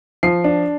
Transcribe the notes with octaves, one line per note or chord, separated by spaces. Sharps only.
F3 C7
D4